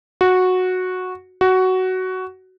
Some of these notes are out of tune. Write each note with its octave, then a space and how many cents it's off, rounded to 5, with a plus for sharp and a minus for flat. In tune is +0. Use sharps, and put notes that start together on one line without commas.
F#4 -10
F#4 +10